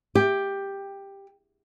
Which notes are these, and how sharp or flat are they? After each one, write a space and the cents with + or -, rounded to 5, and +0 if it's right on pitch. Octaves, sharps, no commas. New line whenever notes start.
G4 +10